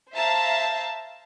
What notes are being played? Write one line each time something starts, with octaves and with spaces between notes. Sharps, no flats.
C5 E5 F5 A5 A#5